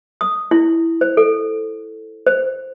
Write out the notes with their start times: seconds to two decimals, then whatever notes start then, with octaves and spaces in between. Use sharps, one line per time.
0.21 D#6
0.51 E4
1.01 C5
1.17 A4
2.27 C5